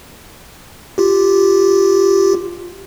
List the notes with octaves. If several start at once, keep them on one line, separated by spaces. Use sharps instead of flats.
F4 G4